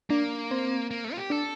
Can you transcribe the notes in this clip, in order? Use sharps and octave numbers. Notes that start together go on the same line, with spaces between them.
A#3 D4
C4
A#3
A3
F4
G4
D4 A4